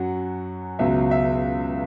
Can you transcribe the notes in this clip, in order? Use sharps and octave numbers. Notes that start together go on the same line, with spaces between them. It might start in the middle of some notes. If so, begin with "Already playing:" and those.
Already playing: F#2 F#3 F#5
C#2 B2 F#3 E5
E5